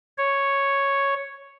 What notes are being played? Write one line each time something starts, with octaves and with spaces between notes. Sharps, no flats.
C#5